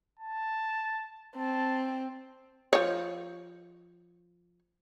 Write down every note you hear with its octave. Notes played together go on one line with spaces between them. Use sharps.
A5
C4 A5
F3 C#5